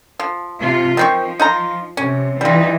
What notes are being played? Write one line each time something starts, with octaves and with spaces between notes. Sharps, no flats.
F3
C3 F4
D#3 F3 C4 C#6
D#4 F4 A#5
C3 C#4
E3 G3 D#4 F4